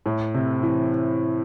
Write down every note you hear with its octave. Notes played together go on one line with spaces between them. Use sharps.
A2
C3
E3